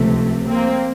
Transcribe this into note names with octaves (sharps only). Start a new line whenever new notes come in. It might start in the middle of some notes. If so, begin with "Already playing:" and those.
Already playing: C#2 C3 F3 A3
A#3 C4